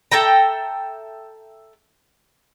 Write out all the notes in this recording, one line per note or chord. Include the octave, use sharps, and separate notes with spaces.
A4 E5 G5 A#5